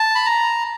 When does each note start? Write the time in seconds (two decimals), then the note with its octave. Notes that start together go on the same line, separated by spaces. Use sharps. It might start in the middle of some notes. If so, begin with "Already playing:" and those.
Already playing: A5
0.15 B5
0.26 A#5